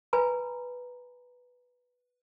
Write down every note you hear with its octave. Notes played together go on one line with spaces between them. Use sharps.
B4 G#5 A#5 B5